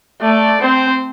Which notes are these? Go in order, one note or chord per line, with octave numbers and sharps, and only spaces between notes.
A3 D5
C4 C5